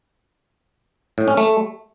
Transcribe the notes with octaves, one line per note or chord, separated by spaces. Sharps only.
A2
C#4
A3